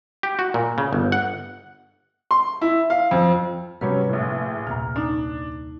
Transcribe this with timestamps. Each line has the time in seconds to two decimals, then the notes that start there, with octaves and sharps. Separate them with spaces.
0.23 G4
0.39 F#4
0.54 A#2
0.78 C#3
0.93 G1
1.12 F#5
2.31 C6
2.61 E4
2.90 F5
3.11 F2
3.81 G#2 C3 F#3 G3 C#4 B4
4.09 A#1 A2
4.67 D#1 C2 A#2 A#5 F6
4.96 D4 D#4